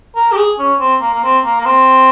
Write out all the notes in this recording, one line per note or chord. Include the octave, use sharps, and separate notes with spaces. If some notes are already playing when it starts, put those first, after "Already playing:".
A#4
G4
G#4
C#4
C4
A#3
A#3
C4
A#3
A#3
C4